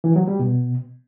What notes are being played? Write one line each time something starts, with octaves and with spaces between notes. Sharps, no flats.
E3
F#3
G3
B2